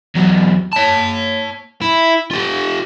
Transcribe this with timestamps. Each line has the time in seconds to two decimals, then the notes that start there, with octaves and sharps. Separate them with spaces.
0.16 E2 F#3
0.73 C#5 A5
1.82 E4
2.31 F4 G4